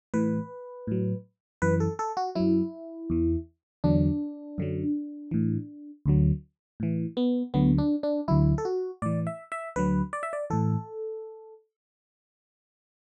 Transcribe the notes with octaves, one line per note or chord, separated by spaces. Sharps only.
A2 E3 B4
A2 F#3
F#2 E3 B4
A4
A4
F#4
F#2 F#3 E4
E2 E3
E2 D3 F#3 D4
F#2 D3 F#3
A2 E3
D2 D3 F#3
A2 E3
B3
D2 D3 F#3 B3
D4
D4
D2 D3 F#3 E4
A4
F#4
A2 E3 D5
E5
E5
D2 D3 F#3 B4
D5
E5
D5
A2 E3 A4